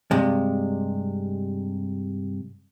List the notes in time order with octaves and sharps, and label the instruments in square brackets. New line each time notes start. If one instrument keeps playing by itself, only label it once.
[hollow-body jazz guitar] G2 C3 G#3